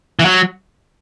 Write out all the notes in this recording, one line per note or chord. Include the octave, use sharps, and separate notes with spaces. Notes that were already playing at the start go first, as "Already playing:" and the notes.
E3
F#3